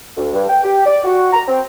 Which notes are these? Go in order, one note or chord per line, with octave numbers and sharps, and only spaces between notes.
D2
G2
G5
G4
D5
F#4
A#5
C4